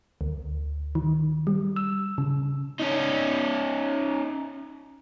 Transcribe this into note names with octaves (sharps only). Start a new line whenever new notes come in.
D2
D#3
G3
E6
C#3
C#4 D#4